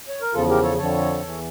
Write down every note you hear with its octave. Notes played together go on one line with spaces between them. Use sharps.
C#5
A#4
E2 C#3 F3 F4 A4
G4 A#4
A4 C#5
F2 D3 F3 A4 C#5
E2 E3